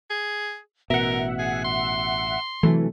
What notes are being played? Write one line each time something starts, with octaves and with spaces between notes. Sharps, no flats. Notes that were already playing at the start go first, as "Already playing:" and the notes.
G#4
A1 B2 A#4 E5 F#5
G#4
C6
C3 E3 F#3 A3